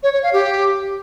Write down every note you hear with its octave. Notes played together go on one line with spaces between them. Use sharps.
C#5
C#5
F5
G4